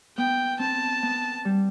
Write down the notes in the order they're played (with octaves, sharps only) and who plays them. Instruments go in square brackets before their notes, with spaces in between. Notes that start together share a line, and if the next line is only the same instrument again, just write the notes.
[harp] B3 [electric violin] G5
[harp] C4 [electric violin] A5
[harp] B3
G3